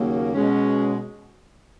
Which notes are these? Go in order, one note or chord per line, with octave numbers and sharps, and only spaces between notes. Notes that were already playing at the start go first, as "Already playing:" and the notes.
Already playing: D#2 C#3 F#3 A#3
B2 G#3 C#4